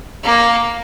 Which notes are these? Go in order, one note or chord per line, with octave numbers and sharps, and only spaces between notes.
A#3